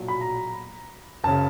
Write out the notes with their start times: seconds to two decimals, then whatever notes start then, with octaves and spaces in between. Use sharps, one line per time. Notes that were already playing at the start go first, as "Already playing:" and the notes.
Already playing: B1 A#2 F#3
0.08 B5
0.21 A#5
1.24 F#1 C#3 A5